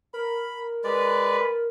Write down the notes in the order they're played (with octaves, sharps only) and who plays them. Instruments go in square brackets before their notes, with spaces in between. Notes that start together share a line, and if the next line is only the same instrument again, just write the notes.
[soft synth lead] A#4 [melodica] B5
[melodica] G#3 D5 [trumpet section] B4